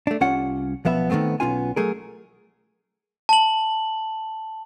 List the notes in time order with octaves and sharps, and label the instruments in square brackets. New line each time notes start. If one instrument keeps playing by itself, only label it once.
[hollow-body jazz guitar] A3 D4
C2 G3 C#4 F4 F#5
B1 F3 B3 E5 B5
D#3 F#3 A3 B3 C4
B1 G2 B3 C#4 F4 G#5
F#3 A3 G#4 A#4
[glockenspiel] A5 F#7